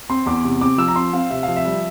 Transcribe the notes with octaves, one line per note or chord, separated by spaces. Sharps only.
C4 C6
E2 D6
C3
C4 D6
F3 E6
A#5
C4 C6
C4 F5
C3 E5
F3 F5
E5
G3